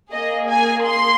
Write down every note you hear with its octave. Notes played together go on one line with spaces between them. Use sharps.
A#3 G#4 D#5
G#5
C6